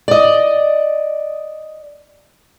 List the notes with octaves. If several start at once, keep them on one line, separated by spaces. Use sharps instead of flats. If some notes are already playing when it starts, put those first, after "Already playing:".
D5 D#5